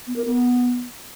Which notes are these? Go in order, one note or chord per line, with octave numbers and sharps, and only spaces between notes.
B3
A#4
B3